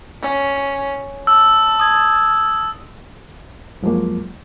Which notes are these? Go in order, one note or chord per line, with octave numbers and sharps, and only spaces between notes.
C#4
A5 E6
D#6 G#6
F#2 F3 F#3 G#3 A#3